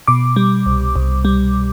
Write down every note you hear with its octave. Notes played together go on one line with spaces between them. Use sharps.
B2 D6
G3
C2
C2
G3